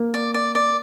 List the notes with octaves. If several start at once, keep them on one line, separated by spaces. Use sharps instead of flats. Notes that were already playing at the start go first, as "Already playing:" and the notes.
Already playing: A#3
D5
D5
D5